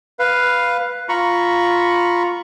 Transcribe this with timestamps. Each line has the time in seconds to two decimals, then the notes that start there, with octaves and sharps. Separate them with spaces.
0.19 B4 F5
1.09 F4 A#5 B5 C#6